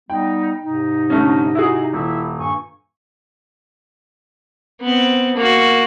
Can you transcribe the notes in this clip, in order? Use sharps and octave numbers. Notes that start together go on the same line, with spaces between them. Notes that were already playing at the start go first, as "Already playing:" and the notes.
G3 B3 D#4 G5
G#2 C3 D#4
D3 A3 C#4
E4 F#4 G#4
D#1 E4 E5
G2 G#5 C#6
B3 C4
A#3 F#4